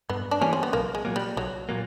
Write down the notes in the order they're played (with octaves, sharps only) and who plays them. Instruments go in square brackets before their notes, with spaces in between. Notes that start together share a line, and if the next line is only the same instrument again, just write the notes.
[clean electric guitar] G2 [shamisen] B3
[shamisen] D4
[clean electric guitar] E3 G3 A#3 [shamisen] C#4
[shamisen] C4
B3
[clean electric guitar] B1 [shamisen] A#3
[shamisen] G#3
[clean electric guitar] A#2 F#3 A#3
[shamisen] G3
[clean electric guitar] B1 [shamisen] F#3
[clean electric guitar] A#2 F#3 A#3